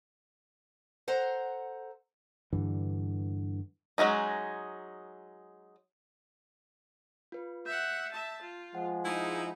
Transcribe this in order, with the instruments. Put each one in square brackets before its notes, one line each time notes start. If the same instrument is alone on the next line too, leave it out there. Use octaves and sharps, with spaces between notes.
[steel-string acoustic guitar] A4 C5 F#5 A#5
[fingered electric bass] G2 D3 E3
[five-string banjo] F#3 G#3 C#4 D#4
[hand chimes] F4 B4
[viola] E5 F#5 [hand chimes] G6
[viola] E5 A5
F4
[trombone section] F3 G#3 [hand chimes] F#5
[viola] D#4 [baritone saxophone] E4